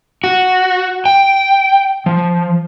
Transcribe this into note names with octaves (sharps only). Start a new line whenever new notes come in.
F#4
G5
F3